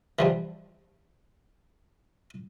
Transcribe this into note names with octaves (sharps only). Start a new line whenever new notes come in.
E3 F3 G3